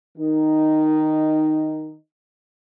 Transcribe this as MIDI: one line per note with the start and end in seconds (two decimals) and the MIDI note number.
0.18 1.96 51
0.18 1.96 63